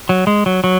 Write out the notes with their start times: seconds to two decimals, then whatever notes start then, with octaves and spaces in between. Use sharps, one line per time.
0.09 F#3
0.27 G#3
0.46 F#3
0.64 F#3